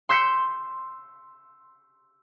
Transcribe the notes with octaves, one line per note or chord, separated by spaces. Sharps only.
C6 E6 G6 B6 C#7